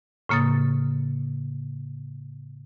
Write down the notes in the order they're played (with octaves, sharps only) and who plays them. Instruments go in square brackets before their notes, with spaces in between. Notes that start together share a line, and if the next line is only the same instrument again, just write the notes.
[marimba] A2 C#3 A#3 D#6 A6